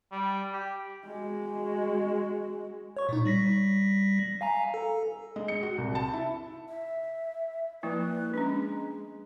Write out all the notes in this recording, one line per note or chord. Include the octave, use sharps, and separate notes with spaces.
G3
G4
G#3 F#4
C#5 C#6
A#2 D#4
G3 A#6 B6
F5 G#5 A#5
A4
G#3
C#7
F#4
C2
A5
E4
E5
F3 A#3 E4 B4
G#3 C#4 D4